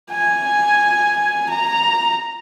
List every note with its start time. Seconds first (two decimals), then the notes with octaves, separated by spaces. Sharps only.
0.11 G#5
1.50 A#5